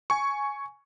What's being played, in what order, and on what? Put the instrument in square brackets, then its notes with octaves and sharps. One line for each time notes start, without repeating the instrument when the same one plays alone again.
[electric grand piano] G#5 C#6